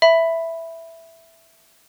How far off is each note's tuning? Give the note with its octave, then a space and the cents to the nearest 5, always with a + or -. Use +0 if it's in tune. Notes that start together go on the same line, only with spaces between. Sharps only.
E5 +0 B5 +0